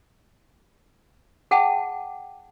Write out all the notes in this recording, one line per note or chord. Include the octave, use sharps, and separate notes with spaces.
G#4 F#5 G5 A5